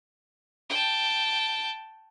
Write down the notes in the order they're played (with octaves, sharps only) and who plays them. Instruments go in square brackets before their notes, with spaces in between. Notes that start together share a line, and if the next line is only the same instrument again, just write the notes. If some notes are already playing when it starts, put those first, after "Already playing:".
[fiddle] G5 A5